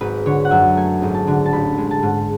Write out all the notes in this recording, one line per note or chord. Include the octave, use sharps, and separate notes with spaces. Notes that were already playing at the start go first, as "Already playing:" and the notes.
G#1 B4
D3 C#5
F#5
F#2 E5
A3 G#5
G#1
A5
D3
A5
A1 B5
G#3
A5
G#2